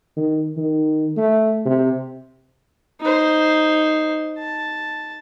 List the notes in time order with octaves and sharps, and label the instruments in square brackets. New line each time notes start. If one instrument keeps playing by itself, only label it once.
[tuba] D#3
D#3
A3
C3
[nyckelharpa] D#4 C5
A5